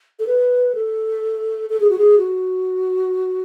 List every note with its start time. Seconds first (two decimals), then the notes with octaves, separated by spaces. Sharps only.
0.19 A4
0.27 B4
0.75 A4
1.70 A4
1.80 G#4
1.90 F#4
1.98 G#4
2.18 F#4